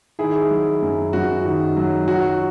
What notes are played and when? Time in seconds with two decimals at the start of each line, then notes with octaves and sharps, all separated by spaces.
0.19 D#3 E4 G#4
0.51 F#3
0.82 F#2
1.13 F#2 F#4
1.45 D#3
1.77 F#3
2.07 F#3 F#4